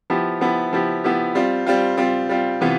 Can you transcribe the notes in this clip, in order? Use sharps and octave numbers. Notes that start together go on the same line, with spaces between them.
F3 B3 E4 G4
F3 B3 E4 G4
F3 B3 E4 G4
F3 B3 E4 G4
G3 C4 F4
G3 C4 F4
G3 C4 F4
G3 C4 F4
C3 E3 B3 F4